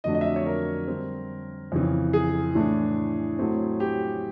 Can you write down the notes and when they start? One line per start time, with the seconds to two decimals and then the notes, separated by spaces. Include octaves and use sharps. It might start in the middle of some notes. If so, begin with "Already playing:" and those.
0.04 F2 D3 F#3 A3 D4 D#5
0.15 D#5
0.21 E5
0.25 D#5
0.36 C#5
0.47 A#4
0.87 D3 G3 C4
1.72 F2 C#3 E3
2.13 G#4
2.55 A2 E3 A3 D4
3.39 A2 F#3 A3 C4
3.80 G4